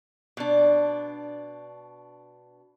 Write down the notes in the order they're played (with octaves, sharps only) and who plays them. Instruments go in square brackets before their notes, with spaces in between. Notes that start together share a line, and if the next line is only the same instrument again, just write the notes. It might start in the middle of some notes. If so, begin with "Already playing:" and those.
[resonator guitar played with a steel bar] B2 D4